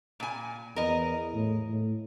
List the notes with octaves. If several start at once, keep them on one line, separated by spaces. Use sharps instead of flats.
A#2 G#5
E2 A#4 D#5
A2
A2